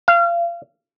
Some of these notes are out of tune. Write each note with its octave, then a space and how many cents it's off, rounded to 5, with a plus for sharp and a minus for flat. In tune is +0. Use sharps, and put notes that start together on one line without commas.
F5 -30